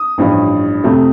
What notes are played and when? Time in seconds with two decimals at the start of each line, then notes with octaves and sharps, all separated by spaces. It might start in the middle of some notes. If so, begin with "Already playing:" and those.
Already playing: D#6
0.18 A1 G2 F3
0.84 F2 C3 F3 A3